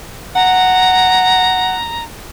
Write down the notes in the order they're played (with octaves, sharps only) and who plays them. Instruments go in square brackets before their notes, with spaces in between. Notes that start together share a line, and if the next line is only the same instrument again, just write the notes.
[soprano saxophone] F#5 [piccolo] A#5